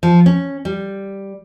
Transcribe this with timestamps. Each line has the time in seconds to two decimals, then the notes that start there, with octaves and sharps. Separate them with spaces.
0.03 F3
0.26 C#4
0.65 G3